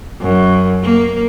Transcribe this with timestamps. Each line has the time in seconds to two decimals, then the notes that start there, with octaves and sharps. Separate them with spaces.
0.21 F#2
0.83 A#3